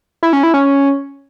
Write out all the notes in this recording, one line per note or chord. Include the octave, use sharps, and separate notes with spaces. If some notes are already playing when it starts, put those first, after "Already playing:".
E4
C#4
E4
C#4